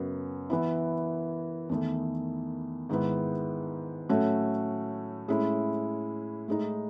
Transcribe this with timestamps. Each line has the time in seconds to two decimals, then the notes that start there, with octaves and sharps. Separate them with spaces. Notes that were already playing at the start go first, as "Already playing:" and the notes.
Already playing: F#2 C#3 F#3 B3
0.50 E3 B3 E4
1.69 E2 D#3 A3
2.89 G#2 D#3 G#3 B3 E4
4.09 A2 F#3 A3 C#4 F#4
5.28 A2 G#3 C#4 E4
6.48 A2 G#3 D#4